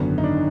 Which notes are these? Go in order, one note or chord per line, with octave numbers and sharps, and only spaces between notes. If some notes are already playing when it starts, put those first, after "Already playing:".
Already playing: G#1 F#2 D3 B3
D#4
D4